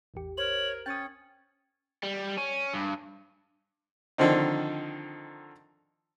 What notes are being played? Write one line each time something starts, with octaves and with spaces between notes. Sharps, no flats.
A1 E2 G4
A#4 C5 C#5 F#7
C#4 G5 D#6 A6
G3
C#4
G2
D3 D#3 F3 C4 D#4